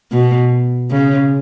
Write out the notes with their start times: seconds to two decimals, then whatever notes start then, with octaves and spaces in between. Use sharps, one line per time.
0.12 B2
0.91 C#3